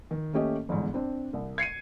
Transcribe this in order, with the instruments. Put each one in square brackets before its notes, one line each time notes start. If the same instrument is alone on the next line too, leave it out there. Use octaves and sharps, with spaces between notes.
[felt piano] D#3
D#2 A3 C#4 G4 D#5
G1 E2 G#2
C4 D4
C2
G#6 C7 C#7 D#7